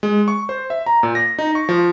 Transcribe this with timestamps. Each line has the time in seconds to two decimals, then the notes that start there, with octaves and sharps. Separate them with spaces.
0.03 G#3
0.28 C#6
0.49 C5
0.70 E5
0.86 A#5
1.03 A#2
1.15 A#6
1.39 D#4
1.55 C#6
1.69 F3